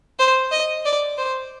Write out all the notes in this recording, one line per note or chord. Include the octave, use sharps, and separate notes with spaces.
C5
D#5
D5
C5